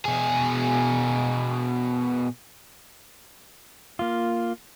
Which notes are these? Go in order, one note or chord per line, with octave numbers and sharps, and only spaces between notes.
B2 G#4
A#3 F4